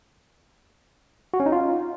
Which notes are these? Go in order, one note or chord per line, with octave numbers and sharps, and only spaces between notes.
F#4
C#4
D#4
F4